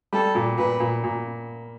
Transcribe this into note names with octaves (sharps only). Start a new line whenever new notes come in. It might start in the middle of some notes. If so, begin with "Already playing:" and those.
G3 A4
A#2
A#2 B4
A#2
A#2